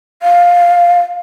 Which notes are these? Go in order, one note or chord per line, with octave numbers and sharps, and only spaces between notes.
F5